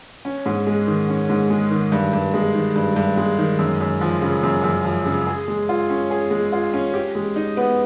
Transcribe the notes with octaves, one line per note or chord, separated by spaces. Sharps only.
C#4
G#2
G#3
D#3
C#4
G#2
G#3
D#3
G2
G2
G#3
D#3
G2
G2
G#3
D#3
F#2
F#2
F3
C#3
F#2
F#2
F3
C#3
G#4
G#3
F4
C#4
G#4
G#3
F4
C#4
G4
G#3
D#4
B3